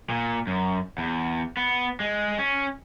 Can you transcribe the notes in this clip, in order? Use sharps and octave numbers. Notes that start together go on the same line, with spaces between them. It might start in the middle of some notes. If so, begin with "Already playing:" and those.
A#2
F#2
E2
B3
G#3
C#4